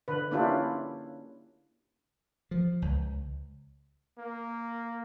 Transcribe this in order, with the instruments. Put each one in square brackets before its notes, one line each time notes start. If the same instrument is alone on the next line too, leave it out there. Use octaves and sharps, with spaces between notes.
[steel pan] D3 B4
A#3 C#4 D4 E4 F4 G4
[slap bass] F3
C#2
[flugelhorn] A#3